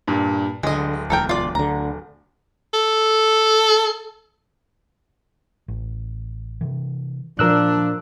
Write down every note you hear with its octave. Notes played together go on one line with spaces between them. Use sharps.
G2 A#2
D1 D3 E3 G#3 D#5
E1 E2 A4 A#4 G5
F4 D5
D2 D3 A#5
A4
A1
C3 E3
A#2 F3 D4 A#4 E6 F#6